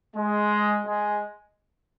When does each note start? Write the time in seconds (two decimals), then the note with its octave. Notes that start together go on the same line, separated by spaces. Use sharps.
0.15 G#3
0.86 G#3